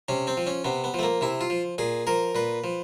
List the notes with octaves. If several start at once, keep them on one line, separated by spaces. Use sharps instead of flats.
C3 C#4
C4
F3
C#4
C3 B3
B3
F3 A3
A#3
C3 E4
F4
F3
A#2 G#4
F3 A#4
A#2 B4
F3